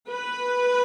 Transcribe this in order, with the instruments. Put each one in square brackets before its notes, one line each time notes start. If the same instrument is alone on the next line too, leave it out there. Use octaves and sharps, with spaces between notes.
[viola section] B4